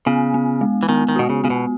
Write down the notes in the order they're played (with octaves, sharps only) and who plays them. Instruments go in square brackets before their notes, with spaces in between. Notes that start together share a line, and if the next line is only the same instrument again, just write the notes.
[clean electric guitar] C#3 [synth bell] B3
[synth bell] B3
G#3
[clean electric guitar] E3
[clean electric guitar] D#3 [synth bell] B3
[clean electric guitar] D#3
[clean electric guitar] B2 [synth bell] F#4
[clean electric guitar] C#3
[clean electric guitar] C#3 [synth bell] B3
[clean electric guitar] B2